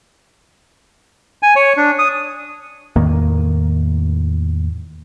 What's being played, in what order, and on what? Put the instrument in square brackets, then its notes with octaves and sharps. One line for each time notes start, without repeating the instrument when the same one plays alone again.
[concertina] G#5
C#5
D4
D#6
[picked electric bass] E2 A2 D#3 A#3